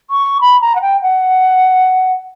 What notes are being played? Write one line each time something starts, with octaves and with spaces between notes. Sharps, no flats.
C#6
B5
A#5
F#5
G5
F#5